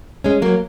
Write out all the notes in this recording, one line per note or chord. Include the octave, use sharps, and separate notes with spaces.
G#3 C#4
F#3 A#3